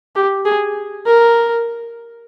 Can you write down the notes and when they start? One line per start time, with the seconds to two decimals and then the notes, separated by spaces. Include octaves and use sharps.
0.16 G4
0.45 G#4
1.07 A#4